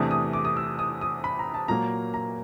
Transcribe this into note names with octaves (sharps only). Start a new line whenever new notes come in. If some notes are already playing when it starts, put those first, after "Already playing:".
Already playing: E2 C3 E3 A3 D4 D#6
D#6
D6
D#6
E6
D#6
D#6
B5
A#5
A5
A#2 F#3 A#3 A#5
A#5